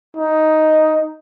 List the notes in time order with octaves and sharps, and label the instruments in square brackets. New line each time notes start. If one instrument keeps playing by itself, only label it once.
[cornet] D#4